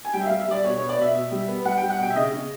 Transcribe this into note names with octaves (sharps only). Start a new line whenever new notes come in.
G#5
G3 G5
E5
G3 F5
E5
G3 D5
B2 C#5
C#5
B3
D5
B2 E5
B2
G3
B3
G3 F#5
G5
G3
F#5
B2 G5
E5
C#3 D#5
C#3